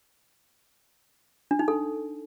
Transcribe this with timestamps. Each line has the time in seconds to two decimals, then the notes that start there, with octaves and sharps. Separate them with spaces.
1.51 D4
1.59 D#4
1.68 A4